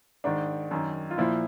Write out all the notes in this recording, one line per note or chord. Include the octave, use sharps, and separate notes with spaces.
G#2 D#3 D4
F#2 D#3
F4
A#2 F3 E4